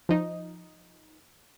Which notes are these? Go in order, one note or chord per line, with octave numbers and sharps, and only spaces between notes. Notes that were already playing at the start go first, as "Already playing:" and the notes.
F3 D#4